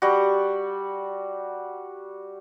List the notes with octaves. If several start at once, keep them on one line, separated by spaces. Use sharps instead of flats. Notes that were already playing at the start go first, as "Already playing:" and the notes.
G3 F#4